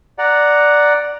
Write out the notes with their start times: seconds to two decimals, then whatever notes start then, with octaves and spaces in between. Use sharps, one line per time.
0.18 D5 F#5 A#5